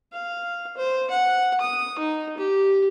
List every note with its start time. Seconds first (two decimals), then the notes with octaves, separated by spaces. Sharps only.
0.13 F5
0.77 C5
1.10 F#5
1.61 D#6
1.99 D#4
2.38 G4